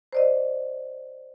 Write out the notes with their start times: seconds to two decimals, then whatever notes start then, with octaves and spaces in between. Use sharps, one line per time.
0.13 C5 D5 D#5